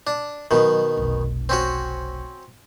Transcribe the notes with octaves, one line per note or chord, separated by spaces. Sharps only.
D4
B2 D#3 F#3
F1 B1
C4 C#4 F#4